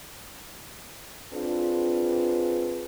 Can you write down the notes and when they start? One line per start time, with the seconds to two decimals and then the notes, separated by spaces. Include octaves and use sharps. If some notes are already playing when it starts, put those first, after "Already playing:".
1.33 C4 D4 F4 G#4 B4